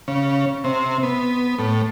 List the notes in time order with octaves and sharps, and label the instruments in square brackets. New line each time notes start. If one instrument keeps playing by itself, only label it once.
[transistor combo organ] C#3
C3
B3
A2